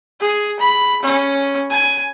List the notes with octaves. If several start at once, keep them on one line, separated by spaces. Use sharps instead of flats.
G#4
B5
C#4
G#5